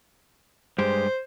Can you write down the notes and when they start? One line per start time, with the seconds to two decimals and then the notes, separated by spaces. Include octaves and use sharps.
0.78 G2 G#3 G4 C5